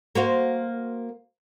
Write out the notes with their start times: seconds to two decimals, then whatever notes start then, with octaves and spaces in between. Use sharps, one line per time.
0.15 A#3 F#4 C5